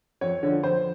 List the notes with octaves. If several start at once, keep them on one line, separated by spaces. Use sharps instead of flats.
F2 C#5
D3 F3 C#5
F2 C5